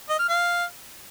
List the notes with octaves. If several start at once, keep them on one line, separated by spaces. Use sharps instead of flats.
D#5
F6
F5